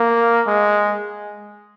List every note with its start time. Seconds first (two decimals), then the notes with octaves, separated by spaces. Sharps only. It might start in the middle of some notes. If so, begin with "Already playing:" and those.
Already playing: A#3
0.47 G#3